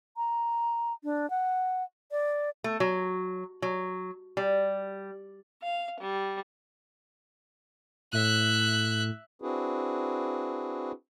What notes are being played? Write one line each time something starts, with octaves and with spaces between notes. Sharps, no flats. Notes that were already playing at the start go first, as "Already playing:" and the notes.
A#5
D4
F#5
D5
A3
F#3
F#3
G3
F5
G3
A2 E5 F#6
C4 D4 E4 F#4 G#4 B4